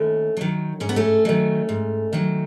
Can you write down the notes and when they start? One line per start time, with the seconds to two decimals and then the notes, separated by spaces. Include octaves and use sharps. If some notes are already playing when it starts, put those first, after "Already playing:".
Already playing: D#2 A3 C#4
0.37 D#3 F#3
0.80 G#2 C#4
0.89 B3
0.96 A3 C#4
1.25 D#3 F#3
1.69 G#2
2.13 D#3 F#3